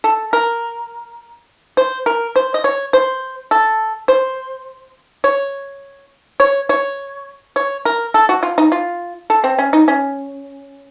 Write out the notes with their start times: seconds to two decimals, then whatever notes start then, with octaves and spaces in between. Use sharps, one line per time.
0.04 A4
0.33 A#4
1.77 C5
2.06 A#4
2.36 C5
2.54 D#5
2.64 C#5
2.93 C5
3.51 A4
4.08 C5
5.24 C#5
6.40 C#5
6.69 C#5
7.56 C#5
7.85 A#4
8.14 A4
8.29 F#4
8.43 F4
8.58 D#4
8.72 F4
9.30 A4
9.44 C4
9.58 C#4
9.73 D#4
9.88 C#4